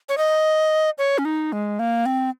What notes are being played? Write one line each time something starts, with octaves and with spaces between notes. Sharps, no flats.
C#5
D#5
C#5
C#4
D#4
G#3
A#3
C4